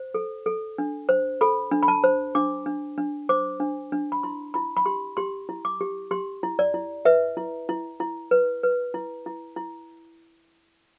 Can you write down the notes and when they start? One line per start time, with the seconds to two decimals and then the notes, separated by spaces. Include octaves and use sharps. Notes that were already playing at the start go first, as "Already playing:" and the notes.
Already playing: C5
0.15 A4
0.46 A4
0.78 D4
1.09 C5
1.41 A4 B5
1.71 D4
1.83 B5
1.88 A5
2.04 C5
2.35 D4 D6
2.66 D4
2.98 D4
3.29 C5 D6
3.60 D4
3.92 D4
4.12 B5
4.23 E4 C6
4.54 E4 B5
4.77 B5
4.86 G4 C6
5.17 G4 C6
5.49 E4
5.65 D6
5.81 G4
6.11 G4 C6
6.43 E4
6.59 D5
6.74 E4
7.05 B4 E5
7.37 E4
7.69 E4
8.00 E4
8.31 B4
8.63 B4
8.94 E4
9.26 E4
9.56 E4